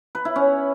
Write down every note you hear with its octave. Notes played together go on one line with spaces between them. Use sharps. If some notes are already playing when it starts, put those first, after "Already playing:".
B4
E4
C#4